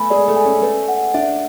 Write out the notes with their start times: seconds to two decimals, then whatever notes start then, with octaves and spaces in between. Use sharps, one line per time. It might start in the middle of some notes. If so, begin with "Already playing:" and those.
Already playing: A3 B3 A4 G#5 B5
0.10 G#3 G#4 D5
0.28 A3 A4
0.36 G#5
0.45 C#4 C#5
0.62 A3 A4 B4
0.88 F#5
1.14 D4 D5 E5